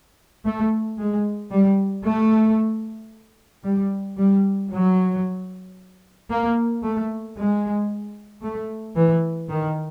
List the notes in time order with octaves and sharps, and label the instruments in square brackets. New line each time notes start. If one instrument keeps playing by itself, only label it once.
[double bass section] A3
G#3
G3
A3
G3
G3
F#3
A#3
A3
G#3
A3
E3
D#3